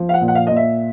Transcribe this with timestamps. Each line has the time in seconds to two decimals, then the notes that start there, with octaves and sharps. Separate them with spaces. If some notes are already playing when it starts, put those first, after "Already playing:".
Already playing: F3
0.09 F5
0.14 F#5
0.21 A#2
0.28 F#5
0.35 F5
0.47 A#2 D#5
0.56 E5